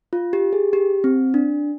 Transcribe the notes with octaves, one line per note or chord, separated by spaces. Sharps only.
F4
G4
G#4
G4
C4
D4